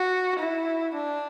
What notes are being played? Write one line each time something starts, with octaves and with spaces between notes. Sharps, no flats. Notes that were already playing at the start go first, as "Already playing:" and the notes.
Already playing: F#4
E4
D4